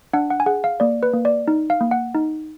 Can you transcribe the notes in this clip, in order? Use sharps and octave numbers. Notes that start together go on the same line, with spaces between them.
D4 F#5
F#5
G#5
G#4 F#5
F5
A#3 D5
B4
A#3
D5
D#4
F5
A#3
F#5
D#4